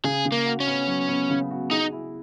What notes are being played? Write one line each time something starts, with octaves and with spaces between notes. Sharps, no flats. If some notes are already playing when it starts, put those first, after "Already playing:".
C#3 G#4
C#3
A#3
F#4
C#4
B3
F#3
B3
C#3
F#4
D#4 G#4
E4